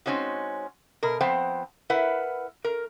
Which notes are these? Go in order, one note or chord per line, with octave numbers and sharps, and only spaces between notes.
G#3 C4 C#4 D#4 F#4
B2 A#4
F3 B3 C4 C5 F#5 G5
E4 A#4 B4 F#5
A#4